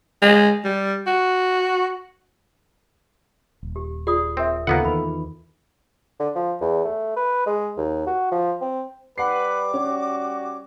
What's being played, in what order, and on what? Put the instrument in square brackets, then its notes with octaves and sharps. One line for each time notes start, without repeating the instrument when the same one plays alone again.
[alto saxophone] G#3
G3
F#4
[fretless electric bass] D#1
[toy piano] G4
[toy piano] F4 D5 D#6 [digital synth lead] G#4
[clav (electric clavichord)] C4 [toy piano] A#4 E5
[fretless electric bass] D#2 C#3 [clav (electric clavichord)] A#3 B3 F#5 [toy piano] F4 D6 [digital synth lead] A4
[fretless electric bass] E2 D#3 [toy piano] B4 B5
[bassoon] D3
F3
E2
A3
B4
G#3
D#2
F#4
F3
C4
[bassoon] G3 [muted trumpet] B4 [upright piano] F#5 C7 [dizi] D6
[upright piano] C#4 [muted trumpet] F#4